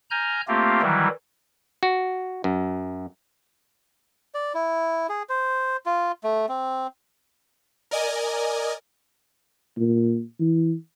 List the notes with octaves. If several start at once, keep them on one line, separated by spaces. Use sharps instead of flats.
G#5 A#5 F6 G6
A3 A#3 C4 F4 G4
D#3 E3 F#3 G3 E4
F#4
F#2
D5
E4
G#4
C5
F4
A3
C4
A#4 D5 D#5 G#5
A#2
E3